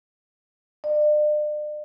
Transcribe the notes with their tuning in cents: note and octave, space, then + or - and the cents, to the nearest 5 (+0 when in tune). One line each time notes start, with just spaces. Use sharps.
D5 +40